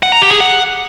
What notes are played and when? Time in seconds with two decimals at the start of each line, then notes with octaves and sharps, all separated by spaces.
0.03 F#5
0.12 A#5
0.22 G4
0.31 G#4
0.40 F#5